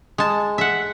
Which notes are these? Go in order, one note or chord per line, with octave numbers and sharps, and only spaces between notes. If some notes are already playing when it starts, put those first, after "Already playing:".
G#3 A5
E5 F#5